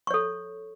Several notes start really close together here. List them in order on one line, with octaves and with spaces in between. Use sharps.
C#6 C#5 A4